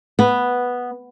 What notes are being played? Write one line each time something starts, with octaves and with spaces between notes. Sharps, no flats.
B3